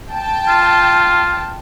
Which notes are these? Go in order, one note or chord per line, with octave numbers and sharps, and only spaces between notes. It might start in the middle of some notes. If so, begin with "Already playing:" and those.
G5 A5
F4